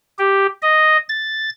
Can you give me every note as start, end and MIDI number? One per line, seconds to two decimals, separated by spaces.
0.19 0.47 67
0.62 0.97 75
1.09 1.49 93